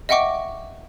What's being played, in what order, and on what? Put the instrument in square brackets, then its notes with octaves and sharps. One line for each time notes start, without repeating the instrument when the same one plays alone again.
[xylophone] D#5 E5 F#5 G5 C#6 D6